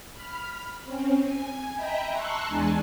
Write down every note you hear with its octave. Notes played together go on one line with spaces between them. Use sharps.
B5 F6
C4 C#4
G#5
D#5 E5 G5 A#5 B5
A5 A#5 C6 C#6 E6 F#6
E2 G#3 D4 G#5 A5